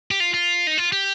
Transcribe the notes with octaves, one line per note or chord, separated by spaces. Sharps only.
G4
F4
F4
D#4
F4
G4